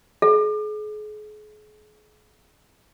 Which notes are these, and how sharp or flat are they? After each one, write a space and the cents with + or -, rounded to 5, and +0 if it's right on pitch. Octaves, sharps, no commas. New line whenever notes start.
G#4 +40